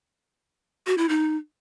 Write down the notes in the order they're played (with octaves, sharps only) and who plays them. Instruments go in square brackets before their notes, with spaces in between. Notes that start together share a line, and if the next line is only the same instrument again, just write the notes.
[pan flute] F#4
E4
D#4